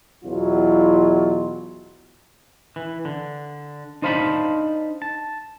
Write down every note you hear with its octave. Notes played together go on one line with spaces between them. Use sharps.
E2 B2 F#3 E4 F4
E3
D3
D4 D#4 C5 F5 A5 B5
A5